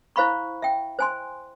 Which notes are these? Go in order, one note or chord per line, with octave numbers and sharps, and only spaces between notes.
E4 C5 F5 B5 C#6
E5 G5
C5 G#5 C6